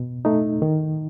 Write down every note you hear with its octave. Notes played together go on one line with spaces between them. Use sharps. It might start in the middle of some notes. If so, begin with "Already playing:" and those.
Already playing: B2
A3 D#4
D#3